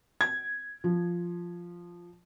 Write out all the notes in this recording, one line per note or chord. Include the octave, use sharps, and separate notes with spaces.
G#6
F3